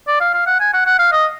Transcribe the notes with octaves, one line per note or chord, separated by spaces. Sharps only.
D5
F5
F5
F#5
G#5
F#5
F#5
F5
D#5